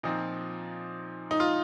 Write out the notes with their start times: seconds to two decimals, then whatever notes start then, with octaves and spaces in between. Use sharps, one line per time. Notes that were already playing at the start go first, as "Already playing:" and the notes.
0.03 A#2 F3 C4 D#4
1.31 D#4
1.40 F4